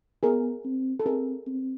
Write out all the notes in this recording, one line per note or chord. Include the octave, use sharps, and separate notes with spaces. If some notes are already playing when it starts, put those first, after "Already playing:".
B3 G#4 A#4
C4
A4
C4 G#4 A#4
C4